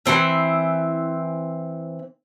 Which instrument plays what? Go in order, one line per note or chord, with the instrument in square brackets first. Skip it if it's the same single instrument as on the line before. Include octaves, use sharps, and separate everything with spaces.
[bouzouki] E3 A#3 C4 E5